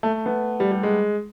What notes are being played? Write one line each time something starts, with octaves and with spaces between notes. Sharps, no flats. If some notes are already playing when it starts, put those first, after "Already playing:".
A3
B3
G3
G3
G#3